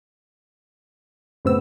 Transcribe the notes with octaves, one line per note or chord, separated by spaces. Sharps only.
F#2 A2 C#3 B3 C4 E6